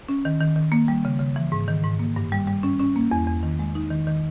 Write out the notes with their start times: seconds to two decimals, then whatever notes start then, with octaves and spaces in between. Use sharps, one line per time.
0.09 C#4
0.25 D#3
0.40 D#3
0.56 D#3
0.72 A#3
0.88 G3
1.05 C#3
1.20 C#3
1.36 E3
1.52 G#2
1.68 D#3
1.83 G#2
1.99 A#3
2.16 G2
2.32 G3
2.47 G3
2.63 C#4
2.79 C#4
2.96 A#3
3.11 E2
3.27 E2
3.43 D#3
3.59 G#3
3.75 D#4
3.91 D#3
4.07 D#3